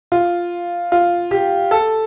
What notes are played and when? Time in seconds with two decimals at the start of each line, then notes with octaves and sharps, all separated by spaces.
0.12 F4
0.92 F4
1.31 G4
1.71 A4